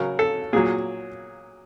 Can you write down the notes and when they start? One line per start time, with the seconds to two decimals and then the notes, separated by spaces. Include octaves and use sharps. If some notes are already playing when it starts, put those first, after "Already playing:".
Already playing: C#3 F#3 A#4
0.19 A4
0.53 A#2 F#3 G#4